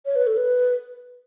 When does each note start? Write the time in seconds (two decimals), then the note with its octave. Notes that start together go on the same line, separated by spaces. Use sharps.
0.06 C#5
0.16 B4
0.27 A4
0.37 B4